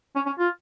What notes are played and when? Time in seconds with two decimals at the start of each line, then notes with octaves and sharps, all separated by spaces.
0.15 C#4
0.26 C#4
0.39 F4